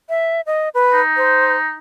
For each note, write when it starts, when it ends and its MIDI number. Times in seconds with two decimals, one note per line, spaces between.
0.09 0.41 76
0.46 0.69 75
0.74 1.01 71
0.93 1.76 63
1.17 1.55 72